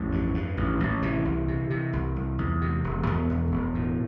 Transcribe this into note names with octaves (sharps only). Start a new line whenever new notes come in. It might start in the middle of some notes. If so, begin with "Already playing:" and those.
Already playing: A1 F2 F3
G2
G2
A1
A1
C3 E3
C2
C3
C3
C2
C2
E2
C3
E1
E2 B2 B3
E2
E1
A2